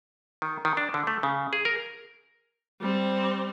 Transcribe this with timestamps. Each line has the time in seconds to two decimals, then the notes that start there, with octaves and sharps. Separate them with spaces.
0.42 D#3
0.65 D#3
0.77 D4
0.94 D3
1.07 A3
1.23 C#3
1.53 G#4
1.65 A#4
2.81 G3 C4